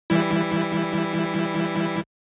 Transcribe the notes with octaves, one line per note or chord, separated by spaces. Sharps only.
E3 G3 E4